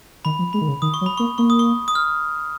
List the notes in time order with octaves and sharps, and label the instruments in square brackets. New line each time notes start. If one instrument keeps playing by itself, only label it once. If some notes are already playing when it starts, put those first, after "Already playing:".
[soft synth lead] D#3 [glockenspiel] B5
[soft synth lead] F3
[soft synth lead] G#3 [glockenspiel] B5
[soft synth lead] D#3
C#3
[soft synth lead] D#3 [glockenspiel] D#6
[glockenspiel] C#6
[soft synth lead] F#3
[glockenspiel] B5
[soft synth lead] A#3 [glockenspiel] C#6
[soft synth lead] A#3 [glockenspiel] C#6
[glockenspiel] D#6
C#6
D#6
F6